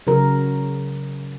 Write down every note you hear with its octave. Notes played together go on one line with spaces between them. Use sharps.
C#3 F#3 A#4